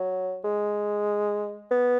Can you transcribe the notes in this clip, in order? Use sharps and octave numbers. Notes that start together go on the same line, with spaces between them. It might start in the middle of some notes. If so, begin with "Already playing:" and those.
Already playing: F#3
G#3
B3